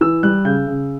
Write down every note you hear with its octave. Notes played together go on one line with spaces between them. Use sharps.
E3 E6
G3 F#6
C#3 G6
C#3